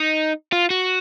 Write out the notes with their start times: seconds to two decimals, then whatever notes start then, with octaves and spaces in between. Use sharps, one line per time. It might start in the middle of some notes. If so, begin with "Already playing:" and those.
Already playing: D#4
0.53 F4
0.70 F#4